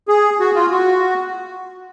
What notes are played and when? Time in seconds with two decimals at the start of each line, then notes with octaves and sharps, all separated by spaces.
0.08 G#4
0.40 F#4
0.55 F4
0.71 F#4